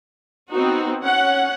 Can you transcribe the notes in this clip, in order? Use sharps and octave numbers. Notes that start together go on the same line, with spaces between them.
B3 C4 D#4 F#4
C#4 F#5